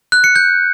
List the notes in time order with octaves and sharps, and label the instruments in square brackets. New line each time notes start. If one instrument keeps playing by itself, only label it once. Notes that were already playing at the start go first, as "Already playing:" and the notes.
[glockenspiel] F#6
C#7
G6